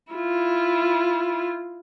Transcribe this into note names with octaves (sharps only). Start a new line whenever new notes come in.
E4 F4